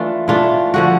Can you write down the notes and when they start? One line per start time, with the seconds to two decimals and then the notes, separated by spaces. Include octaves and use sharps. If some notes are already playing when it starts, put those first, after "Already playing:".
Already playing: E3 A3 D4 F4
0.28 E3 A3 D4 F4
0.74 D3 F3 F#4